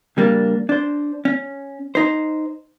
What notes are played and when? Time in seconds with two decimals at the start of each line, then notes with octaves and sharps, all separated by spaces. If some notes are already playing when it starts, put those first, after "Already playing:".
0.17 C#3 G3 A#3 D4
0.69 D4 C5
1.25 C#4
1.95 D#4 C5